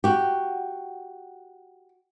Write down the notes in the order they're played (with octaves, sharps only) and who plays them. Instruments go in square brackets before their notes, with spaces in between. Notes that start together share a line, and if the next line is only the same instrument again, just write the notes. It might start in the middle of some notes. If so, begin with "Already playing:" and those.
[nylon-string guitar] F#4 G4